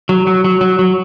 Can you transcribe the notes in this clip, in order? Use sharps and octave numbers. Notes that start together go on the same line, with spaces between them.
F#3
F#3
F#3
F#3
F#3